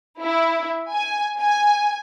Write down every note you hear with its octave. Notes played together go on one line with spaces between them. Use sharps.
E4
G#5
G#5